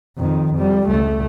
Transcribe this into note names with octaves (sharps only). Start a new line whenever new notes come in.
F2 D#3
F2 G3
C#2 A3